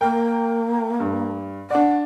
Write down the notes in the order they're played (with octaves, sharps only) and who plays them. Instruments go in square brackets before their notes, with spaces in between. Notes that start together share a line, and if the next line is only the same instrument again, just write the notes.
[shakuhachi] A#3 [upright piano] A#4 G5
[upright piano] G2
[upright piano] D4 D5 [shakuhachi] F#5